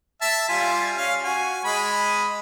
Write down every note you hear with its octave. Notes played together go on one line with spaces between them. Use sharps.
E5 A5
G3 F4 G#5
C#4 F5
F#4 G#5
G#3 B5